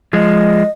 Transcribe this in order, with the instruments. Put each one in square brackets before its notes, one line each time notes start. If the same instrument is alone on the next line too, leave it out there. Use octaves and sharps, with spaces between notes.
[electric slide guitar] F3 G#3 [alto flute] D#5